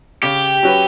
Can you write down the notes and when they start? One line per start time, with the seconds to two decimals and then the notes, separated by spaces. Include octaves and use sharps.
0.23 C#3 G4
0.63 F#3 C#4 F#4 B4